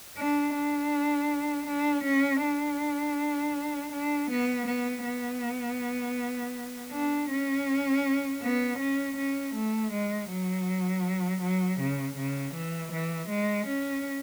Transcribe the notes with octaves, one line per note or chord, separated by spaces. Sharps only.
D4
D4
D4
C#4
D4
D4
B3
B3
B3
D4
C#4
B3
C#4
C#4
A3
G#3
F#3
F#3
C#3
C#3
E3
E3
G#3
C#4